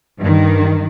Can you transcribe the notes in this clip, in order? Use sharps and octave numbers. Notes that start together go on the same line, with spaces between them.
G2 D#3